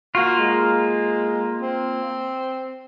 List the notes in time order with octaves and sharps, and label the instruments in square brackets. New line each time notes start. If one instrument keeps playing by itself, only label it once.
[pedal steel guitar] A#3 F4 [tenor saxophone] F#4
[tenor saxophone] G#3
C4